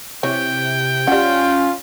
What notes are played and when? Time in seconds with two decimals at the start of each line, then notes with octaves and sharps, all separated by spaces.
0.23 C3 E3 C#5 G5
1.07 G3 C#4 F4 F#5